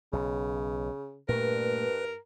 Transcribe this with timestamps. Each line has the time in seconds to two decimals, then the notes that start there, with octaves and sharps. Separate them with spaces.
0.13 B1 C#3
1.29 G2 A#2 A3 A#4 B4